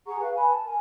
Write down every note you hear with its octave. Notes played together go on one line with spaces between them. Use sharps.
G#4 F#5 A#5 C#6
B4 F5
B4 G#5 B5
A5
A#4 G#5